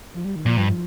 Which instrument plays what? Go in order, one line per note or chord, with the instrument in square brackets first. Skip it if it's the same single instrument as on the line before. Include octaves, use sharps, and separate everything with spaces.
[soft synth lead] F3
G3
D#3
[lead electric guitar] A#2 [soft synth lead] F3
[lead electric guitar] G2 [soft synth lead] F3
[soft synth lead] F3